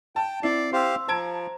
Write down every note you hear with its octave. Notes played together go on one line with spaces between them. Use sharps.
G5 A5
C4 E4 D5 C7
G4 C5 F5 C6 E6
F3 C5 A5 A#5 G#6 D7